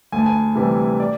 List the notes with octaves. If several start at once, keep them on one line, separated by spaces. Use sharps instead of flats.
D2 G#5
A5
G#5
C3 E3 G3
D5